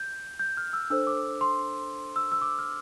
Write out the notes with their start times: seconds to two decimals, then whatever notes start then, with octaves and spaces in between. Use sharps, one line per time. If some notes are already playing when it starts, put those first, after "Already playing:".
Already playing: G6
0.39 G6
0.57 F6
0.73 E6
0.90 D4 A4 C5 E6
1.07 D6
1.41 C6
2.16 E6
2.32 E6
2.42 D6
2.59 F6